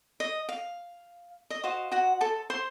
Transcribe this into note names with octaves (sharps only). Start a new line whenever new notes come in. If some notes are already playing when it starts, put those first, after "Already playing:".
D#5
F5
D#5
F#4 C5 D#5 F5
F#4 F#5
A4 A5
C5 C6